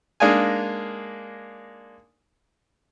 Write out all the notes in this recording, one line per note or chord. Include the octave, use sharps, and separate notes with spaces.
G#3 A#3 D4 D#4 F5 G#5